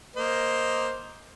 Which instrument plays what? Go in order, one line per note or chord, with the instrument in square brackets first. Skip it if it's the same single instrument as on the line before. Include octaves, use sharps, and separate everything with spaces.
[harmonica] A#3 C5 D#5